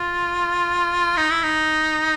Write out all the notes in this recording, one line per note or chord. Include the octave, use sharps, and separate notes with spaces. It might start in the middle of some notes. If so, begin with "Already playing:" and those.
Already playing: F4
D#4
E4
D#4